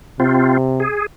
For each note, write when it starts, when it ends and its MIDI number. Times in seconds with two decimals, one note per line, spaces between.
0.20 0.85 48
0.20 0.57 60
0.20 0.57 65
0.80 1.06 68